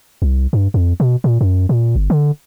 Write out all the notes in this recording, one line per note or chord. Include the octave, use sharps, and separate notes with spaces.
C2
G2
F2
B2
A#2
F#2
A#2
G1
D3